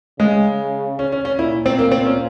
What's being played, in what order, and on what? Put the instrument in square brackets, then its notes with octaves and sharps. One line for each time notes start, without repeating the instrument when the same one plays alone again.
[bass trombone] C#3 [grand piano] G#3
[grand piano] C#4
C#4
C#4
[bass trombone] A#2 [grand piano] E4
[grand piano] C4
A#3
C4
C#4